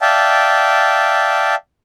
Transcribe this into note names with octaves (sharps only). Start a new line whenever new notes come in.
D5 E5 F5 G5 A5